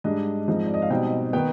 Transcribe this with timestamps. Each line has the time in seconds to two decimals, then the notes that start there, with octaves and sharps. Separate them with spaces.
0.04 G#2 G3 D4 D#5
0.48 G#2 F3 C4 D#4
0.65 D5
0.74 D#5
0.82 F5
0.90 B2 G3 C4 D#4 G5
1.33 D#3 B3 G5